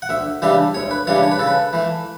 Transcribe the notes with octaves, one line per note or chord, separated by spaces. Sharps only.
F#5
D2 E5
C#3 E3 G3 D4 E5
D2 C#5
B4
C#3 E3 G3 D4 C#5
C#5
B4
C#3 A4
B4
E3 A3